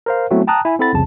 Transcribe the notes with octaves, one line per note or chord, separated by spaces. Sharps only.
A#4 C5 F5
F#3 A3 B3 C4 E4 F#4
G5 A5 A#5 D#6 F#6
E4 G#5
C4 E4 A4 F#5 B5 A6
C2 F2 C#3 A5